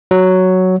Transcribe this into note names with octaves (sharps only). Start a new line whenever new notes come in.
F#3